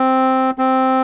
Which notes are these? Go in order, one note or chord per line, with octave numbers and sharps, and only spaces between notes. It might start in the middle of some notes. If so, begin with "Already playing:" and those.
Already playing: C4
C4